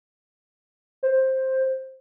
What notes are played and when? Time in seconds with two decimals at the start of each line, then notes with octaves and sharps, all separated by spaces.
1.03 C5